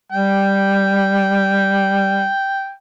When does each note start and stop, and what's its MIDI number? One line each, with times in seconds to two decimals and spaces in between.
0.12 2.29 55
0.12 2.71 79